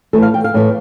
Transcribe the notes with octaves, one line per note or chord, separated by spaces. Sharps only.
A2 E3 A3 A4
F5
G5
F5
A2 E3 A3